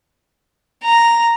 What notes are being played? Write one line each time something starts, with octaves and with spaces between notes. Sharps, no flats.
A#5